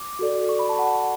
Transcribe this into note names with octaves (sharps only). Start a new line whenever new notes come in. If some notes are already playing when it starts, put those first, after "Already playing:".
Already playing: D6
F#4 A4 D5
C#6
B5
A5
F#5